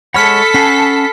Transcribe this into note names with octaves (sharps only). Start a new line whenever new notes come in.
G#3 A4 C#5 F#5 B5 F6 B6 C#7
C#4 F#5 G#5 C7